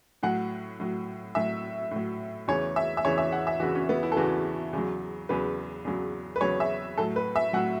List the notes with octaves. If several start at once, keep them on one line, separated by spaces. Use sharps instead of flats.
A2 F#3 F#5
A2 F#3
A2 F#3 E5
A2 F#3
E2 C#3 E3 C#5
E5
E5
E2 C#3 E3 C#5
E5
F#5
E5
E2 C#3 E3 F#4
C#4
B3
E4
A4
E2 C#3 E3 F#4
E2 C#3 F#3
E2 C#3 F#3 B4
E2 C#3 F#3
B4
E2 C#3 F#3 C#5
E5
A2 F#3 A4
B4
E5
A2 F#3 F#5